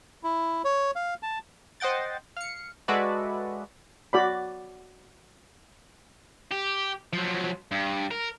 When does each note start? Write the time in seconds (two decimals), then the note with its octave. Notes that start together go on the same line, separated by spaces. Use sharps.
0.23 E4
0.65 C#5
0.96 F5
1.23 A5
1.80 C5 D#5 F#5 G5 A6
2.37 F5 C#7
2.88 G#3 F#4 A4 B4 D5 E5
4.13 F#4 D5 B5
6.51 G4
7.13 F3 F#3
7.71 G2
8.11 A#4